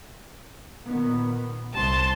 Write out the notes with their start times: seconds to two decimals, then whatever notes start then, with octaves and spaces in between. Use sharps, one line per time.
0.85 A#2 D#3 B3
1.74 C2 A5 C6